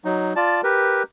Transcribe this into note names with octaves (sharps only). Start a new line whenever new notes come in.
F#3 D#4
F4 D5 A5
G4 A#4 B4